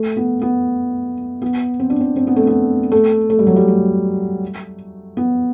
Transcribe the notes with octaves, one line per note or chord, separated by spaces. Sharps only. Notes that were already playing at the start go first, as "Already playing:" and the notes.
Already playing: A3
B3
B3
B3
C4
D4
C4
C4
B3
A3
B3
A3
A3
G3
F#3
G3
A3
B3